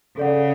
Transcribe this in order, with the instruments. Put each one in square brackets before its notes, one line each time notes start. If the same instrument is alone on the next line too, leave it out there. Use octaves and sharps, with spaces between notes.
[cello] C#3 [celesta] A4 D5 F#5